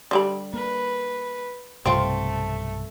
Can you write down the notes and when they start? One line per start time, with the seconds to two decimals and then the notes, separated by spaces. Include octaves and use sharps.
0.11 D3 G3 B5
0.53 A#3 B4
1.86 B1 G2 C3 A3 C4 F4